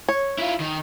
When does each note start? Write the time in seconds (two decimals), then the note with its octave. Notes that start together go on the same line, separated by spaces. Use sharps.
0.09 C#5
0.38 E4 F4
0.60 D#3